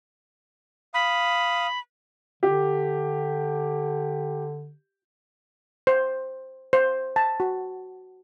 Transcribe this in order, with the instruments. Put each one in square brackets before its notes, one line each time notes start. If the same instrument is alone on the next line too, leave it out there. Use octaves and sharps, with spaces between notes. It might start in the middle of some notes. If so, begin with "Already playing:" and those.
[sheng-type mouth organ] F5 D#6 [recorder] B5
[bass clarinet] D3 [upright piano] G4
[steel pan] C5
C5
A5
F#4